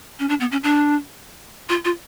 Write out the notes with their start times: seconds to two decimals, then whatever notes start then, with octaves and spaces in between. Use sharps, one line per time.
0.19 C#4
0.29 D4
0.40 B3
0.52 C#4
0.64 D4
1.69 F4
1.85 F4